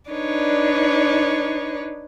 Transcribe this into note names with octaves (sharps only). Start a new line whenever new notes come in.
D4 D#4 B4 C#5 D5